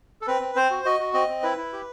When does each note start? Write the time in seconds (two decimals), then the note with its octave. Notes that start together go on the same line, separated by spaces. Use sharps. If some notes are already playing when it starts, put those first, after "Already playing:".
0.21 A4
0.27 C4 B4
0.41 C4
0.56 C4 C5
0.70 F#4
0.85 F#4 D#5
1.00 F#4
1.14 C4 D#5
1.28 C4
1.43 E4 B4
1.57 E4
1.72 G4